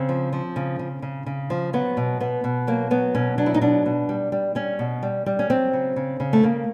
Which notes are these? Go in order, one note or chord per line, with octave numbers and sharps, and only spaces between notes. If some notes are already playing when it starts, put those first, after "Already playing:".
Already playing: C#3 C4
F3
F3
C#3
C#3
C#3
C#3
F3
F#3 B3
B2
B2 B3
B2
F#3 A#3
F#3 B3
B2 C#4
F#3 D4
E4
D#4
B2 D4
B2
G3
G3
G3 C#4
B2
G3
G3
C#4
F#3 C4
C#3
C#3
C#3
A3
C#3 A#3